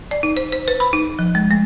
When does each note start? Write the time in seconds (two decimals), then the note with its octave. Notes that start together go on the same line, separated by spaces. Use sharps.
0.11 D5
0.23 D#4
0.37 C5
0.52 C5
0.68 B4
0.80 B5
0.93 D#4
1.19 F3
1.35 G#3
1.51 A3